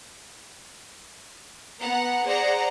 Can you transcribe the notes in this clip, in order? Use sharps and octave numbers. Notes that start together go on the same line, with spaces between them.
B3 F#5 A#5
G#4 C5 D5 F#5 A#5